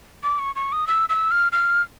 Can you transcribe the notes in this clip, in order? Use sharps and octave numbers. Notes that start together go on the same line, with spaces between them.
D6
C#6
C#6
D#6
E6
E6
F6
F6